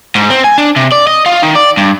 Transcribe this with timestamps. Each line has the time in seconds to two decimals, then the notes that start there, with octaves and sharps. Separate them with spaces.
0.15 G#2
0.30 C4
0.44 G#5
0.58 D4
0.76 C3
0.92 D5
1.07 D#5
1.26 F4
1.43 D#3
1.56 D5
1.77 G2